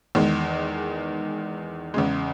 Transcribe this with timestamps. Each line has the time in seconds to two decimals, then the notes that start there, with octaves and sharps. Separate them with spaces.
0.15 E2 D#3 G#3
1.94 E2 C#3 G#3